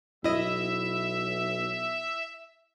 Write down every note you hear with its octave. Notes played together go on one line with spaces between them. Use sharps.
B1 E4 D#5 E5